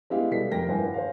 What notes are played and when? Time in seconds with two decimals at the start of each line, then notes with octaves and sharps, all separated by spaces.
0.10 G#3 B3 E4 G4 F5
0.31 C2 B2 A4 D5 B6 C7
0.51 F1 A#4 G5 A#6
0.68 D#1 G2 E4 C5 F#5 G#5
0.94 C5 C#5 F5